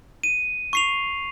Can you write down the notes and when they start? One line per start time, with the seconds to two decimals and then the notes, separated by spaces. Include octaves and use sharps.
0.24 D#7
0.73 C#6 C7 F7